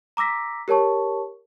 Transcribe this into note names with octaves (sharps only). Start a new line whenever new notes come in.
A#5 D6 E6 A#6 B6
G4 A#4 C#5 A5 C#6